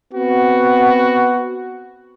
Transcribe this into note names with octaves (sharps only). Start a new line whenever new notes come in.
B3 C4 F#4